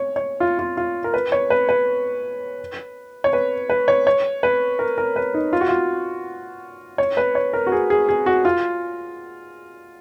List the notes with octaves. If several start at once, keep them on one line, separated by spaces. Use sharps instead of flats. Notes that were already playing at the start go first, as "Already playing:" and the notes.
Already playing: C#5
C#5
F4
F4
F4
A#4
B4
C#5
B4
B4
C#5
B4
B4
C#5
C#5
B4
A#4
A#4
B4
D#4
F4
F#4
F4
C#5
B4
C#5
A#4
F#4
G#4
G#4
G#4
F#4
F4